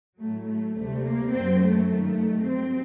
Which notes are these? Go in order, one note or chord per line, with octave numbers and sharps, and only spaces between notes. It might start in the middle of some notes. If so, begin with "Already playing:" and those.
A2 F#3 A3
A3
D2 C3 G3 A3
A#3
F#2 F#3 C4
A3
G2 D#3 F#3 A3
G2 F#3 C4